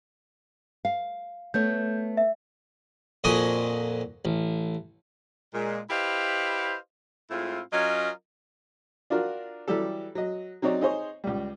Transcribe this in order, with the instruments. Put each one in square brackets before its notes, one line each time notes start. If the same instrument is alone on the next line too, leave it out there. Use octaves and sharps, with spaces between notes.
[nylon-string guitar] F5
[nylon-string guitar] A3 B3 C#5 [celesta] G6
[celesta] E5
[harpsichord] F2 A#2 F#4 D#5 G#5 D#6
A1
[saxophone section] A#2 G#3
E4 G4 B4 C5 D#5 F5
A2 G#3 C4 E4 F4
F#3 C#4 F4 A#4 D#5
[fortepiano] D4 F4 F#4 A#4
E3 F#3 G3 G4 A4
F#3 D#5
F#3 C4 D#4 C#5 D5
D#4 G#4 C5 C#5
C#2 G3